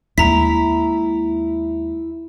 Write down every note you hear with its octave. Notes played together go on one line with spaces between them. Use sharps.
D#2 G#3 E4 A#5 B6